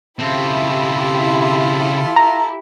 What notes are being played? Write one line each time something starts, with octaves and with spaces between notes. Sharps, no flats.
C#3 C4 E4 F4 G4 A4
A#5